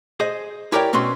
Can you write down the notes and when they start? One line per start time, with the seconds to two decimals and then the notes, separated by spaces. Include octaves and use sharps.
0.20 G#4 C5 D#5
0.72 E4 G4 A#4 C#5 D5 G5
0.93 B2 C4 C#4 B4 C6